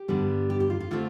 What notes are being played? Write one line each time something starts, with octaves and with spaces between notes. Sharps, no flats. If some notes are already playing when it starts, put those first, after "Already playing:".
Already playing: G4
G2 D3 G3 B3
G4
G4
F4
F4
D3 A3 C4 F4